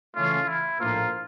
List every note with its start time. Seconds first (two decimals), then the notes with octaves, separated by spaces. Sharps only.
0.16 C#3 E3 A3 C#4 F4
0.48 E4
0.79 A#1 A2 F3 A#3 F4